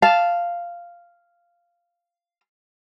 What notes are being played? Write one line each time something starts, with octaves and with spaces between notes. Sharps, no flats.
F5 A5